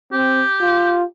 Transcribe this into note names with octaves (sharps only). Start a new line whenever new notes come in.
C4 G4
F4